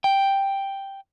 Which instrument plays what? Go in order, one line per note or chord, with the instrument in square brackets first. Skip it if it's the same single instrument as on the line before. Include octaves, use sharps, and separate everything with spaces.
[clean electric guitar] G5